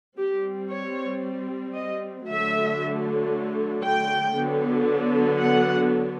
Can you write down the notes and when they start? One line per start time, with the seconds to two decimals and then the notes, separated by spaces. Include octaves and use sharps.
0.18 G3 C4 G4
0.70 C#5
1.74 D#5
2.27 D3 F#3 A3 E5
3.83 G5
4.35 D3 F#3 B3
5.40 F#5